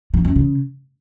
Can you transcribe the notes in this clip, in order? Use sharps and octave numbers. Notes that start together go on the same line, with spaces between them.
F3
F#2
C#3